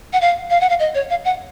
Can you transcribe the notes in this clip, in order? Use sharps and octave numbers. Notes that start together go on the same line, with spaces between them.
F#5
F5
F5
F#5
F5
D#5
C#5
F5
F#5